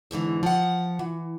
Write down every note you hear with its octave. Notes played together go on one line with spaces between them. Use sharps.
E2 G#2 D3 E3
F3 F#5
E3